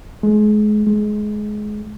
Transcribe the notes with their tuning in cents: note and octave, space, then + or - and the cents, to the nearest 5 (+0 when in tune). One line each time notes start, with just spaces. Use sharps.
G#3 +30
G#3 +20